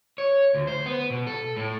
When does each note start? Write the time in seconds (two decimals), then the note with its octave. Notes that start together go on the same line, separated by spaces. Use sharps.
0.18 C#5
0.55 D2
0.67 C5
0.86 B3
1.10 B2
1.27 A4
1.57 A2